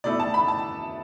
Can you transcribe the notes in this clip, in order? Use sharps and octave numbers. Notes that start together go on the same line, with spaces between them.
B2 A3 E4 D5
A5
B5
A5